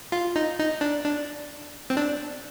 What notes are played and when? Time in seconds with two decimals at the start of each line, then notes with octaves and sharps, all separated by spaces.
0.12 F4
0.36 D#4
0.59 D#4
0.81 D4
1.04 D4
1.90 C4
1.97 D4